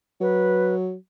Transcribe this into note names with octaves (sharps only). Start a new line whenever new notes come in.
F#3 B4